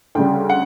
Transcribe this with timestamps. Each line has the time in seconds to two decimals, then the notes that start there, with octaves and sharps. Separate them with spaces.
0.15 D2 C#3 G3 G5
0.50 F#5